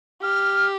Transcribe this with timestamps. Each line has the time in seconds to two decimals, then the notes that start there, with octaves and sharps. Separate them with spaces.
0.22 G4 F6